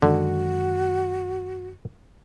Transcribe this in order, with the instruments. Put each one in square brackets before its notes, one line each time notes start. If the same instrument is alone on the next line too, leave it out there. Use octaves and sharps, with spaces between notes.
[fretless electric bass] F#2 D#3 G#3 [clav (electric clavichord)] D3 [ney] F#4